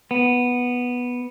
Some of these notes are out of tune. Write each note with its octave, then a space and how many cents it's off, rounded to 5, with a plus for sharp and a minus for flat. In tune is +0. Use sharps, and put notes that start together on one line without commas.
B3 -5